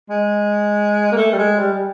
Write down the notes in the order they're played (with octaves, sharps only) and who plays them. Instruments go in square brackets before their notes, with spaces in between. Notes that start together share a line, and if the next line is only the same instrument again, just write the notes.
[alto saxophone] G#3
A#3
A3
G3
G#3
G3
G3